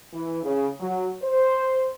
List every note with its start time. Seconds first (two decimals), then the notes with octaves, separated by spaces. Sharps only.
0.13 E3
0.43 C#3
0.79 F#3
1.22 C5